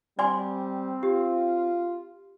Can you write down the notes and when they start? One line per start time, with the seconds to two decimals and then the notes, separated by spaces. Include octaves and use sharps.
0.19 G3 C4 D5 G#5 C6
1.03 F4 G4